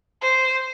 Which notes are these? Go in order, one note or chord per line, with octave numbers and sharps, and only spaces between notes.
C5